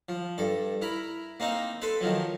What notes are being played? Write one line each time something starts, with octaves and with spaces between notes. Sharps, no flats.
F3
G2 A4
E4 A#4 B5
A#3 C4 D#4 F5
A4 B4 A5 C6
D#3 F3 F#3